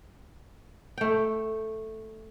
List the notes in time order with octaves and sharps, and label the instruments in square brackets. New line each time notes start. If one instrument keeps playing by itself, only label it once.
[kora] A3 G5